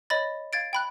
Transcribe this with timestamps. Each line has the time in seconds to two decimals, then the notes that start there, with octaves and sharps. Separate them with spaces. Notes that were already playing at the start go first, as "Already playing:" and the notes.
0.10 C#5 D#5 B5 A6
0.53 F5 G#6 A6 D7
0.73 G5 B5 F#6